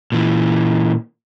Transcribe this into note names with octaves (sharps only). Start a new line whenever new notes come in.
A#2 E3